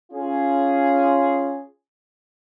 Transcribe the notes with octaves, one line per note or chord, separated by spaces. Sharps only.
C#4 F4 G#4